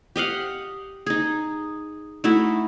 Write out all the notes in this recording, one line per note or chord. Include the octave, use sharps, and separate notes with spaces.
G4 D#5 F5 F#5
D#4 G#4
A3 D#4 E4 F#4